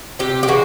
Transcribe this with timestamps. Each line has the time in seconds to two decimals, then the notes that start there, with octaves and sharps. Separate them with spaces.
0.19 C3 G4
0.43 G4
0.48 E3 G#3 F#4